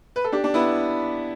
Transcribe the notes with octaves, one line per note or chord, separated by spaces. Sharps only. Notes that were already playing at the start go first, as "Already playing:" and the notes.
B4
A4
D4 G4
D4
B3 E4